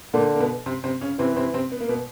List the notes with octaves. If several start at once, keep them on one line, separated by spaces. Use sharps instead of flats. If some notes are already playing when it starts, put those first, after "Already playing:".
A#2 D3 A#3
A#3
B2 B3
C3 C4
C3 C4
C#3 C#4
C3 E3 C4
B3
C3 C4
C3 C4
B3
A#3
B2 B3